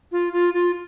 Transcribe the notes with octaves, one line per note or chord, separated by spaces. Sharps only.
F4
F4
F4